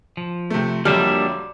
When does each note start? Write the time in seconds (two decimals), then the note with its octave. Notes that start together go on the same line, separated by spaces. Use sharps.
0.17 F3
0.50 C3 A3
0.85 F2 D3 F#3 G3 A#3 D4 E5